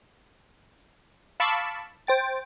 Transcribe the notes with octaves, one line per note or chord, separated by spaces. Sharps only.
F5 A5 B5 C#6 D6 E6
C5 G5 A6